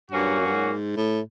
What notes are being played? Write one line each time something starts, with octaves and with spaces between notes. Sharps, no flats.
G2 A#2 F#3 A#3 C#4 F#4
F#2
G2
G#2
A2